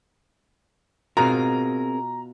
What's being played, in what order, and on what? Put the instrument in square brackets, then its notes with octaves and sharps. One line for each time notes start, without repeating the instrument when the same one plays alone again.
[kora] B2 F4 [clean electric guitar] C4 G#4 A#4 [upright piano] A#5